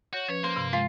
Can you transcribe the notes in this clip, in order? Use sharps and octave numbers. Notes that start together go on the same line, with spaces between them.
F#4 C#5 G6
F3 C#4 B4 C#5
A#3 C5
G2 C3
G#3 F4